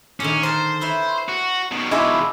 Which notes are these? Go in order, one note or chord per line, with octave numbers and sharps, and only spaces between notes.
A#2 D3 D#3 C#4
A#4 C5 A5
E4 B4 C#5
F#4
B2 D#3
G#3 D4 E4 F4 B4